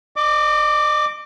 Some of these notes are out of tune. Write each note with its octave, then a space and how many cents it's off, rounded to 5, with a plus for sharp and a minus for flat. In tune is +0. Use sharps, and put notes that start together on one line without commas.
D#5 -40 D6 +0